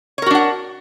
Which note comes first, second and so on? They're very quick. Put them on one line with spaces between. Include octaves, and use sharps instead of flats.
C#5 A#4 F#4 D4 F#5